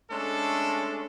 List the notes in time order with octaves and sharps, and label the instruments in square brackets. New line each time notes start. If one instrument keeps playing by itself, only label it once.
[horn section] G#3 A3 C#4 D4 A4